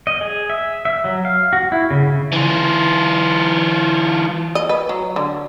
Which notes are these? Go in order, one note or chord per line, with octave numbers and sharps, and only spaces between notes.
D#5
G#4
E5
E5
F#3
F5
F#4
E4
C#3
C#3
E3 F4
D#5
B4
F#3
D3